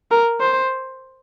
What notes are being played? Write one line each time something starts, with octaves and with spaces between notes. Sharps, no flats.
A#4
C5